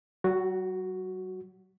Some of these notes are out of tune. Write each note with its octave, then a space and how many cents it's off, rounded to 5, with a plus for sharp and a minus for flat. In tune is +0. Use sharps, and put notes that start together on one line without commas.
F#3 +45 F#4 +0